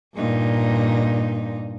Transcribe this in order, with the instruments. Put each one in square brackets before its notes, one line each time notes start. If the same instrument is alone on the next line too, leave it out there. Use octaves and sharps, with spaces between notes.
[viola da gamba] G2 A#2 D#4